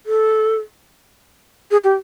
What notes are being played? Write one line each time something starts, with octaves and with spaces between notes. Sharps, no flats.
A4
G#4
G4